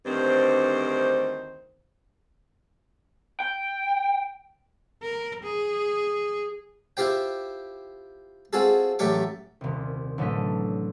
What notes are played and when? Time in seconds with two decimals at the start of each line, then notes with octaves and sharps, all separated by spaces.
0.06 D2 G2 D#3 C4 C5
3.40 G5
5.03 A#4
5.43 G#4
6.97 E4 F4 G4 C5 G5
8.53 C4 F4 F#4 G#4 A4
8.99 A1 F#3 A3 G4 C#6 D6
9.61 D#1 C2
10.18 A1 D3 F#3 A3 D#5 B6